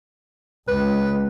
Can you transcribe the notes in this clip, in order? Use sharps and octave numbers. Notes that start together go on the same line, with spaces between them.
C#2 B4